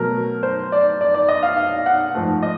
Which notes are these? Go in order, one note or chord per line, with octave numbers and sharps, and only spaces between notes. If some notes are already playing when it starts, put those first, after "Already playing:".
Already playing: B2 F#3 A3 A#4
C5
D5
D5
D5
D#5
F5
F5
F#5
G#2 F3 A3
D#5